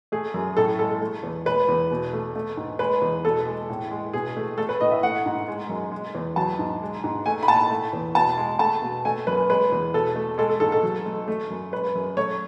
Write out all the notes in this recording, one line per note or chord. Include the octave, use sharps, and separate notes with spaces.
A3 G#4
F#2
A2 A4
G#3 A4
A3
E2
G#3 B4
E2
B2
A3
A3
G#2
G#3 B4
E2
B2 A4
G#3
A2
G#3
B2 G#4
A3
A3 A4
B4
A2 D#5
E5
A3 F#5
G#2
G#3
F#2
G#3
E2
F#3 A5
G#2
G#3
G#2
A3 G#5
B5
A2 A5
A3
E2
B2 A5
G#3
A3 A5
B2
A3 G#5
F#2 B4
G#3 B4
E2
B2 A4
A3
G#3 A4
A4
G#2 A4
A4
F#3
A3
A3
F#2
G#3 B4
F#2
A3 C#5